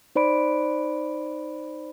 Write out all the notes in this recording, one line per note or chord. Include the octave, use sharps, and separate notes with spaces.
D#4 C5 D5 B5 D7